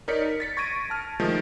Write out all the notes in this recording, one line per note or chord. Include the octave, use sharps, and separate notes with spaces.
D#4 A#4 C#5 D5 B6 C#7
A#4
A6 B6 C#7
C#6 G#6 A#6 D7 D#7
A5 F6
D#3 F3 G#3 A3